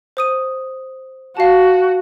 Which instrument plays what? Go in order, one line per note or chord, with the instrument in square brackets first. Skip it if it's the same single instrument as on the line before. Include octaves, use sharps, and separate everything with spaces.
[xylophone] C5 D#6 D#7
[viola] F#4 [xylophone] F5 A5